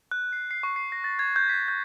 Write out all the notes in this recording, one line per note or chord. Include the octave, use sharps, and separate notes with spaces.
F#6
C7
C7
C#6
C7
A#6
A6
G#6
G6
B6
G6